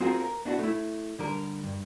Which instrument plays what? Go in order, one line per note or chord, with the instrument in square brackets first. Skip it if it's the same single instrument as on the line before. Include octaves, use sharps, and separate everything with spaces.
[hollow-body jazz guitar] C4 F4 F#4 G#4 A#4 C5
A#4
B3 D4 E4 F#4
A3 E4
D3 G3 A#4
G2